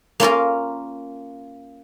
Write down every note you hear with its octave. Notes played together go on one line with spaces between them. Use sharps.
A#3 C#4 F4 A#4